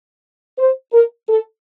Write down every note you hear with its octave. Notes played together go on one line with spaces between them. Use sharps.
C5
A#4
A4